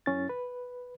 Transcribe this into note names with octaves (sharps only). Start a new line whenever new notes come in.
F#2 C#4 E4 A6
B4